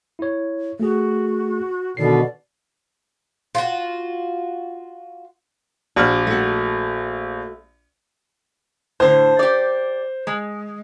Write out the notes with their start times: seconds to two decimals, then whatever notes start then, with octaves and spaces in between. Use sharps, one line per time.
0.19 E4 C#5
0.80 A3 F#4 G#4
1.97 B2 D3 D#3 D5 C7
3.55 F4 F#4
5.96 A#1 F#4 D5 F6
6.27 A3 F#4
9.00 A2 D3 C5
9.39 G4 D5
10.27 G#3